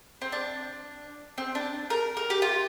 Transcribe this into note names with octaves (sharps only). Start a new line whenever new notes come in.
C4
D4
C4
D4
A#4
A#4
G4
F4